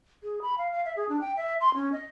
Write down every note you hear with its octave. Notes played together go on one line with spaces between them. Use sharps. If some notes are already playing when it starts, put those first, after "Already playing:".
G#4
B5
F5
F5
E5
G#4
D4
G5
E5
C6
C#4
D#5